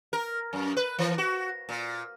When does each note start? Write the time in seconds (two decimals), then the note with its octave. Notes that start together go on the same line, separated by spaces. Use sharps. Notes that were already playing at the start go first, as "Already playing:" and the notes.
0.13 A#4
0.53 F#2
0.77 B4
0.99 E3
1.18 F#4
1.69 A#2